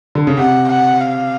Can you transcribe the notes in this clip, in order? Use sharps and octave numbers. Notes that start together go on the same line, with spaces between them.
D3
C#3
C3 F#5
F#5
F5